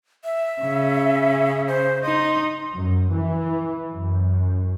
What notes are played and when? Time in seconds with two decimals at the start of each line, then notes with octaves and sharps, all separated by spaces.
0.24 E5
0.62 C#3
1.68 C5
2.04 D#4 C6
2.73 F#2
3.11 E3
3.92 F#2